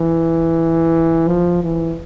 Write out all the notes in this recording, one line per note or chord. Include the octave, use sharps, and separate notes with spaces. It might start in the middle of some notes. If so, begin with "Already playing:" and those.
Already playing: E3
F3
E3